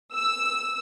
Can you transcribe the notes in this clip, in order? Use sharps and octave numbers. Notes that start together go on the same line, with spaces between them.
E6